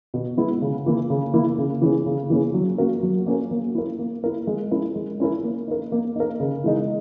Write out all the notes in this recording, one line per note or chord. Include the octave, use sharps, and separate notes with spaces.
B2
G#3 B3 E4
C#3
E3 A#3 E4
C#3
E3 A#3 E4
C#3
E3 A#3 C#4 G#4
C#3
E3 A#3 C#4 G#4
F#3
A#3 C#4 F#4 A#4
F#3
A#3 C#4 F#4 A#4
A#3
E4 A#4
A#3
E4 A#4
G#3
C#4 E4 A#4
G#3
C#4 E4 A#4
A#3
D#4 A#4
A#3
D#4 A#4
C#3
E3 G#3 D#4